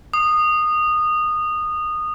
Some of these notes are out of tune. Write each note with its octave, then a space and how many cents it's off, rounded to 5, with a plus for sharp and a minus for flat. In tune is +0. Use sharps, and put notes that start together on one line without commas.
D#6 -20